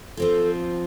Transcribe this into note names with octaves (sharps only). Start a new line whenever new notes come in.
F3 C4 F4 A4